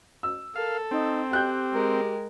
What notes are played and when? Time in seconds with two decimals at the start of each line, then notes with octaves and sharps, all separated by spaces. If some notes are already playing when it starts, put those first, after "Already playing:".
0.23 E6
0.56 A4 A#4 F5
0.91 C4 D#4
1.31 G4 G5 F#6 G6
1.72 G#3 A#4